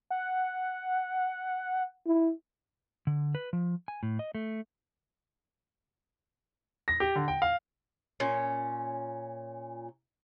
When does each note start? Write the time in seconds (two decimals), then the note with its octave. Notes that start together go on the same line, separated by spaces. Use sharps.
0.10 F#5
2.06 E4
3.07 D3
3.35 B4
3.53 F3
3.88 G#5
4.03 A2
4.19 D#5
4.35 A3
6.88 A#6
7.00 G4
7.15 D3
7.28 G5
7.42 F5
8.20 A#2 C#4